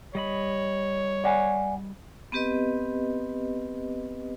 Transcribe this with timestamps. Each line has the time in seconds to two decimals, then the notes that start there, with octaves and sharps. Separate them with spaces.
0.15 G3 C#5 D#5 B5
1.24 D5 F#5 G#5
2.32 B3 C4 G4 B4 D#5